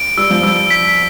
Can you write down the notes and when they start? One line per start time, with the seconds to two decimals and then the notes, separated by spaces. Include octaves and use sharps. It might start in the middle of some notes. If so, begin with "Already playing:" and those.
Already playing: D7
0.17 G3 E6
0.30 F3
0.43 G3 E6
0.70 B6